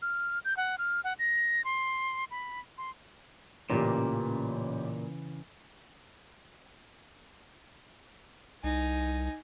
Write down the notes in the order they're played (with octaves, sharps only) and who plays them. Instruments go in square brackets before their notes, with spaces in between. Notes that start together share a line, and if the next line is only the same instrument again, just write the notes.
[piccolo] F6
G6
F#5
F6
F#5
A#6
C6
B5
C6
[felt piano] A1 G4 [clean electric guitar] A#2 [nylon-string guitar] C#3 E3
[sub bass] C2 [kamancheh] D#4 G#5